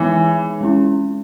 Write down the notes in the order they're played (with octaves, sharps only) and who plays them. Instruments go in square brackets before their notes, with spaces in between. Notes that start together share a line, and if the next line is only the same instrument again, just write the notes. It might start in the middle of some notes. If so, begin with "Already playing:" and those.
Already playing: [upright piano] E3 [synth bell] G#3 B3 D#4 G#4 C#5
[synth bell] G#3 C#4 E4